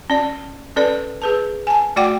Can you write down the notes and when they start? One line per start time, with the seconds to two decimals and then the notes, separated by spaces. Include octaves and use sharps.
0.10 C#4 D5
0.76 C#4 A4 B4 D5
1.22 G#4 B4 A5
1.67 G#5 A5
1.96 A3 F#4 D5 F#5 G5 D6